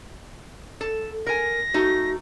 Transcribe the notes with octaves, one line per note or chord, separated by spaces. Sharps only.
A4
A#4 G#5 A#6
A3 D#4 F#4